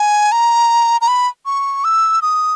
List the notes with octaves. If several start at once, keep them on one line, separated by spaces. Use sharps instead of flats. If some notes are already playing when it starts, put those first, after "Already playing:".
Already playing: G#5
A#5
A#5
B5
C#6
E6
D#6